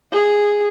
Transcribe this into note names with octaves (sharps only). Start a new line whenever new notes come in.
G#4